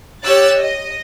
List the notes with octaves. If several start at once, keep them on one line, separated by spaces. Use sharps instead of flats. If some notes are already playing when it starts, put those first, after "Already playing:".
G4 C#5 E6 F#6 A6
D#5